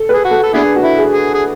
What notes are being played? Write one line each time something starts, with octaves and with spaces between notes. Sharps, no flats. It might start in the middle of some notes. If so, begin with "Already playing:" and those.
Already playing: A4
B4
G#4
F#4
A4
A4
B3 D4 E4 G#4
F#4
E4
G#4
G#4
G#4